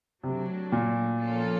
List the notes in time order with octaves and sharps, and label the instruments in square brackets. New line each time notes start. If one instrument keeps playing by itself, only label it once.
[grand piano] C3 [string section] F#3 A3 D4
[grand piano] A#2
[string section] F3 A#3 C#4 F4 A4